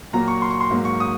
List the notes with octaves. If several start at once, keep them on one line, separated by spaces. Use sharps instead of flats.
A#2 F#3 A#3 A#5
C#6
C6
C#6
C6
G#2 F#3 A#3
C#6
D#6